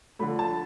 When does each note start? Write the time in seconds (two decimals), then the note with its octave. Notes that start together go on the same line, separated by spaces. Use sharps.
0.19 D3 F3 A3 B5
0.39 A5